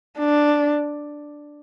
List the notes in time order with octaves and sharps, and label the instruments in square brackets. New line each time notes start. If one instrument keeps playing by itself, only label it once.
[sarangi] D4